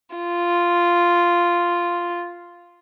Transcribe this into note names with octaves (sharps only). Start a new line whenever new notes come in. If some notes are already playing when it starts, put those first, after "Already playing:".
F4